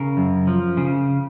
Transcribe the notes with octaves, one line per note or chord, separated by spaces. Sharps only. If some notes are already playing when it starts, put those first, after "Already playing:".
Already playing: C#3 A#4
F#2
F3
C#3